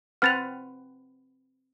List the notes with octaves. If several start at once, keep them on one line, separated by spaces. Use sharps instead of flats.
C4 B4 F#5 F6 A6 F7